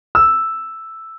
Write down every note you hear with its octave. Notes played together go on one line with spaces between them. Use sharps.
E6